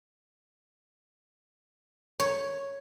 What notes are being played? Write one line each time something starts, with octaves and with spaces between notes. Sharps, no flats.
C#5